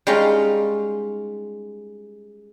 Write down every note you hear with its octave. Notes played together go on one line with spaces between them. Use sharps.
G3 G#3 C#4 D#4 F4